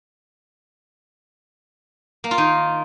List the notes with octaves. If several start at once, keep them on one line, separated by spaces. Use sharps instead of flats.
A#3
F4
D#3